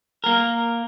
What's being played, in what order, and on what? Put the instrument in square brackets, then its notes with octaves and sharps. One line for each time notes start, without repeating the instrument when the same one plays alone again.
[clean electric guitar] A#3 A#4